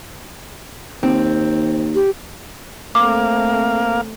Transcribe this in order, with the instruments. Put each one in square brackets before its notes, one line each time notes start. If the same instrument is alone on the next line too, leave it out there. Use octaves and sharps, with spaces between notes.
[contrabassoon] D#2 [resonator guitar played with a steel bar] C4
[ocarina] G4
[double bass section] A3 C4 [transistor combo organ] A#3 F5 [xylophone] D6